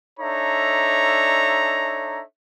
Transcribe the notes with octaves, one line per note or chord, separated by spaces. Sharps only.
D4 D#4 A4 C#5 E5 A#5